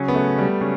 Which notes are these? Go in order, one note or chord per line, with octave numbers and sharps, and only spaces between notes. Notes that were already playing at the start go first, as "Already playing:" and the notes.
Already playing: C#3 F#3 C#4
B3
A3
G3
C#3 F#3 C#4